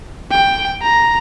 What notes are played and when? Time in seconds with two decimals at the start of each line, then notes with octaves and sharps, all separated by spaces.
0.31 G5
0.82 A#5